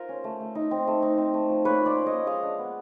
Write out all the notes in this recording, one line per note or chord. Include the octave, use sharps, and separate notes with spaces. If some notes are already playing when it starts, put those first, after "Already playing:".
Already playing: F4 A#4 C5
C#4
A3
A3
D#4
C4
A3
D#4
C4
A3
F3
A#3 B4 C#5
F4
C5 D5
C#4
C#5 D#5
A#3
G#3 D#5 F5
D4
B3